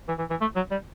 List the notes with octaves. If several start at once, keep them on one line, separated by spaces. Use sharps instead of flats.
E3
E3
E3
A3
F#3
G3